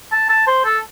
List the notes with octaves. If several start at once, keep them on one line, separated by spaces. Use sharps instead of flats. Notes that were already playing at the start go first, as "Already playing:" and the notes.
A5
A5
C5
A4